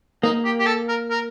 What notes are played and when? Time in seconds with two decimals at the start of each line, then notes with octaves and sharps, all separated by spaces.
0.23 A#3 D#4
0.45 G4
0.59 G4
0.66 A4
0.88 A#4
1.10 A#4